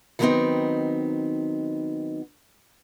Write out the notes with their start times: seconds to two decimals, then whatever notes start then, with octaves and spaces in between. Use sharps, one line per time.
0.19 D#3 F#3 G3 B3 C4 D#4